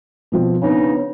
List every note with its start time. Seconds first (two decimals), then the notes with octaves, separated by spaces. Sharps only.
0.32 B2 F3 C4
0.61 C#3 B3 C4 D4 D#4